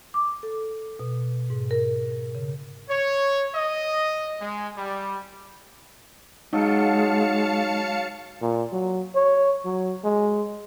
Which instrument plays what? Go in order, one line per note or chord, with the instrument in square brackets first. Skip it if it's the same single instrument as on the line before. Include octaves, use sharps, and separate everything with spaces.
[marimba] D6
A4
B2
G#2
A#4
C#3
[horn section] C#5
D#5
G#3
G3
[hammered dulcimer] F#3 [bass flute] G#3 [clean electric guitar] D#4 [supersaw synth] F5 A5 C#7
[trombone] A#2
F#3
C#5
F#3
G#3